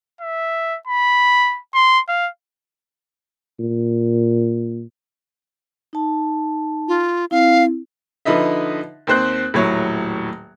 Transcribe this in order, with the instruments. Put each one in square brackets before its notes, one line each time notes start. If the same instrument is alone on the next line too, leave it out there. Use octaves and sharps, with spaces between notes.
[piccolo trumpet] E5
B5
C6
F5
[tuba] A#2
[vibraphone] D#4 A5
[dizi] F4
[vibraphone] C4 E4 [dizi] F5
[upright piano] D3 F3 D#4 B4 D#5 E5
D#2 C4 C5 F#6
D#1 A2 F#3 C#5